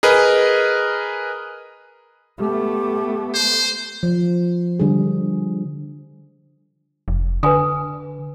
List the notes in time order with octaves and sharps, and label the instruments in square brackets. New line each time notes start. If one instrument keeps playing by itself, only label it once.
[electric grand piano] G#4 A#4 B4 D#5
[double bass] A3 B3 [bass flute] G4
[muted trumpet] C5
[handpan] F3
D3 G3 G#4
[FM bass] F1
[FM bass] D3 [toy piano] B4 G#5 D#6